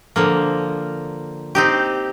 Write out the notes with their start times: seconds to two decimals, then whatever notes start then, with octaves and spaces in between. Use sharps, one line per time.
0.16 D3 F3 A#3
1.55 C4 D#4 G4